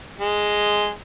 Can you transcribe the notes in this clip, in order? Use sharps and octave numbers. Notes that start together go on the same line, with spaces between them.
G#3